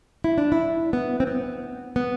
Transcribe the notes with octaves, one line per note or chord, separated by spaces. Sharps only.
E4
D4
E4
B3
C4
B3
B3